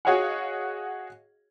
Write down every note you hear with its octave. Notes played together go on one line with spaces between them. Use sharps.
F#4 G#4 C#5 D#5 F5 F#5